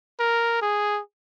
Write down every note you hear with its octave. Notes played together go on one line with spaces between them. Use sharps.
A#4
G#4